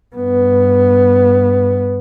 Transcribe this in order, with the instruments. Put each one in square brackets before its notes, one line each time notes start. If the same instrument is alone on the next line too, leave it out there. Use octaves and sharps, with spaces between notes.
[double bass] G2 B3